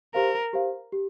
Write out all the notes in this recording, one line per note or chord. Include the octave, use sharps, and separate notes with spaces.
G4 A#4 C5 F5
G4 C5 F5
G4